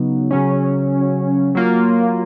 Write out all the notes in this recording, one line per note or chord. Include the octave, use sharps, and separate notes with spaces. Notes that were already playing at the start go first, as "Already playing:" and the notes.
Already playing: C#3 F#3 B3 D#4
C#3 F#3 C#4
F#3 A#3 F4